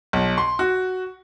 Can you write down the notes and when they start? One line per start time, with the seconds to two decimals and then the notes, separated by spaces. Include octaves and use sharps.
0.13 B1
0.38 C6
0.59 F#4